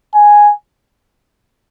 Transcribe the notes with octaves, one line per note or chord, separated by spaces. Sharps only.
G#5